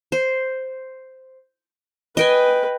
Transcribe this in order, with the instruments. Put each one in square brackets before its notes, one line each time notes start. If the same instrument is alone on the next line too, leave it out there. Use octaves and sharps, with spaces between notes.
[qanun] C5
[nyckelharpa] B4 [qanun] D#5 G5 G#5